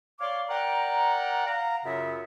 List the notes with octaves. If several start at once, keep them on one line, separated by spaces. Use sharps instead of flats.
C#5 D5 F5 C6 D6
A#4 D5 F#5 G5 A#5
F5 F#5 A#5
F#2 C#3 F4 C#5 E5